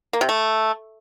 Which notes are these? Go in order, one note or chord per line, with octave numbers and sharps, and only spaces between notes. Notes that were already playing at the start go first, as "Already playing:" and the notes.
A#3
C3
A3